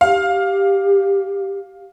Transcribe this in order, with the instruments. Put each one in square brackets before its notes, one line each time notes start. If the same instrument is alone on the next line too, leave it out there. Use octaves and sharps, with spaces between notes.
[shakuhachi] G4 [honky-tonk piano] F5